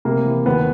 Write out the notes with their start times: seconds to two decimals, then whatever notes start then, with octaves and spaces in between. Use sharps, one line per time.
0.05 C3 A#3
0.25 E3
0.46 D#2 B3